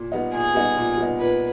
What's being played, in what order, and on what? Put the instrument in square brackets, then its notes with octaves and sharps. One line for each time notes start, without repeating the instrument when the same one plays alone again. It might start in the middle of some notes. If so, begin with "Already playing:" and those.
Already playing: [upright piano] A#2
G3 B3 D#4
[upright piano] A#2 [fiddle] G#4
[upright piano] G3 B3 D#4
A#2
G3 B3 D#4
[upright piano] A#2 [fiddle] B4